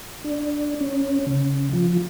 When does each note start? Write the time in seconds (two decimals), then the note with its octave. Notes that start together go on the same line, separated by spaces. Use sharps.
0.24 D4
0.81 C#4
1.26 C#3
1.73 F3